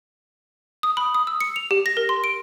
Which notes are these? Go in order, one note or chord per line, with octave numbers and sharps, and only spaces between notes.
D#6
B5
D#6
E6
C#7
F7
G4
A#6
A#4
C6
D7